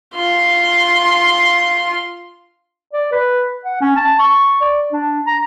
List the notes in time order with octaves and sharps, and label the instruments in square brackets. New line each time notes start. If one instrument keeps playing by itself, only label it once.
[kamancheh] F4 C6
[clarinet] D5
B4
F#5
C#4
A5
C#6
D5
D4
A#5